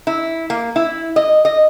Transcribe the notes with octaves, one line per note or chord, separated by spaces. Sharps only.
E4
A#3
E4
D#5
D#5